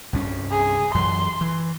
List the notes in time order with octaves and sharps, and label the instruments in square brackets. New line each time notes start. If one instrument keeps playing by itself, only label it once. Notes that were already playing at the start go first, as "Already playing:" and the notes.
[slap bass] C2 G2 C#4
[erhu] G#4
[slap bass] F#2 E3 [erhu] C6
[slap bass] E3